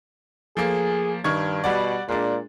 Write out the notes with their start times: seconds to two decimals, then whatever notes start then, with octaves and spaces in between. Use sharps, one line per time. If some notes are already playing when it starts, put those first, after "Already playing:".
0.57 F3 A3 A#3 G#4
1.24 G2 D#3 C#6 G#6
1.64 B2 G3 F#4 D5
2.08 A#2 G#3 D4